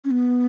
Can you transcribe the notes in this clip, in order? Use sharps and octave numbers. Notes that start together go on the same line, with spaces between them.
C#4
B3